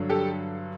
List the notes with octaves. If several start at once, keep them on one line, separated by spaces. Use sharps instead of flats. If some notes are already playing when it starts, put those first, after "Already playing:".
Already playing: G2 D3 F#3
G4 A4